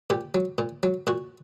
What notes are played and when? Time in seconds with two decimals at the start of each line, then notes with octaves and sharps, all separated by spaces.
0.10 A#2 G4
0.34 F#3
0.58 A#2
0.83 F#3
1.07 A#2 F#4